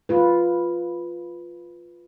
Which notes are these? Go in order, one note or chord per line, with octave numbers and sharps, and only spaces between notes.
F4 B4